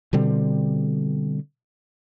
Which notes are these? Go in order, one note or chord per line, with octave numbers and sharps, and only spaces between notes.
B2 D3 G3 C4